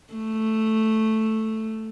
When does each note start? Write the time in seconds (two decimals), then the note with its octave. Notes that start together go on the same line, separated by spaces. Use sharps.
0.14 A3